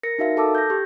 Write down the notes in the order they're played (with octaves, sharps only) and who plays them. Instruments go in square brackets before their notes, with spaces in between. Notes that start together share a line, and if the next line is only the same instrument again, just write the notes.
[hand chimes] A#4 A#6 C#7
D#4 F#4 A#4 E5 F5
A4 A5 D6 E6
G6 A#6
G4